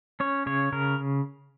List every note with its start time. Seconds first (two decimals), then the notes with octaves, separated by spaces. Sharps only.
0.20 C#4 C#5
0.46 C#3 C#5
0.72 C#3 A#4